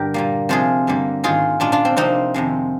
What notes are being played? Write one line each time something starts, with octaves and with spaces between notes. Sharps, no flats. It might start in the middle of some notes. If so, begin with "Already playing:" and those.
Already playing: G2 D3 G4 A#4
A#2 G3 A#3
C3 F3 G#3 F4 G#4
G2 D3 G3 A#3
G#2 D#3 G#3 F4 G#4
A#2 G#3 D4 F4
D4 F4
C4
C3 F3 A#3 C4 D#4
F2 C3 D#3 G#3